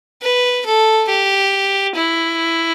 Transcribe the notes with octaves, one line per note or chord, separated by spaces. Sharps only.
B4
A4
G4
E4